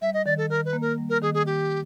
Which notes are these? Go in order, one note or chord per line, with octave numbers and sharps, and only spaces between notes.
G3 E5
D#5
D#3 D5
A4
D#3 A#4
B4
A#3
A#4
G3
A#4
D#3 G#4
G#4
D#3 G4